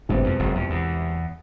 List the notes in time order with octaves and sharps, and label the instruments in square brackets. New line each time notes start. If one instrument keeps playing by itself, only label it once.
[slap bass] G1 G2 [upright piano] C2 B2 G#3 C4
[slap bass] F2
F#1 F#2
F2
E2